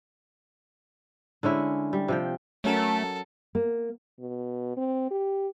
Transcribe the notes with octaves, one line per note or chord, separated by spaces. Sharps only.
D3 G#3 C#4 E4
G3
C3 F3 G5
F#3 A3 C#4 A4 A#4
A#3
B2
C4
G4